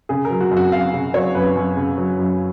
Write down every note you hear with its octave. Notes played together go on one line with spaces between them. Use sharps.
C#3 G#4
A#4
F#3
F#4
F#2
F#4
F#2 F5
C#3
F#3 C#5
F#2 B4
F#2
C#3
F#3
F#2